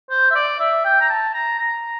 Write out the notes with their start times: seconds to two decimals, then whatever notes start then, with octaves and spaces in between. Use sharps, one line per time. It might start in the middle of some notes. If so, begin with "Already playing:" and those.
0.10 C5
0.31 E5
0.35 D5
0.60 E5
0.85 G5
1.01 A#5
1.10 A5
1.34 A#5
1.59 A#5